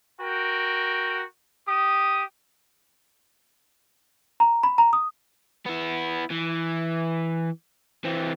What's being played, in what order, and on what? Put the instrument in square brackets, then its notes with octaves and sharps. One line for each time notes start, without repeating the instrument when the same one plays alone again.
[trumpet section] F#4 A#4 G5
G4 D#6
[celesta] A#5
B5
A#5
D#6
[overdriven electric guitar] B3 E4
E3
E3 C4